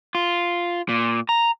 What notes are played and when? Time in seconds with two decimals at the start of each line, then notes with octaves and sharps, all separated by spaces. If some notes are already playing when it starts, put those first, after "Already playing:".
0.15 F4
0.89 A#2
1.29 A#5